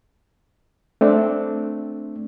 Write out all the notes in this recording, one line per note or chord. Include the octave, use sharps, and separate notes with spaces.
A3 C4 D4